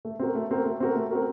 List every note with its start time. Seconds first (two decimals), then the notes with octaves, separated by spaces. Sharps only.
0.05 A3
0.19 C4 F#4 A#4
0.35 A3
0.51 C4 F#4 A#4
0.65 A3
0.80 C4 F#4 A#4
0.95 A3
1.11 C4 F#4 A#4